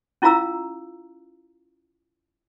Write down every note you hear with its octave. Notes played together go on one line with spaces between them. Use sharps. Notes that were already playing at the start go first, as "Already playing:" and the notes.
C#4 E4 F4 F5 A#5 E6